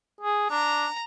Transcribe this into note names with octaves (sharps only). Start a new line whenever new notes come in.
G#4
D4 A#5